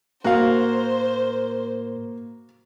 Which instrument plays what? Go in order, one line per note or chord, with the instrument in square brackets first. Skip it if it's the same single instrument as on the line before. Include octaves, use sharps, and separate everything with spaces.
[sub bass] A2 [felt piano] A#3 [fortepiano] F#4 F5 [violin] C5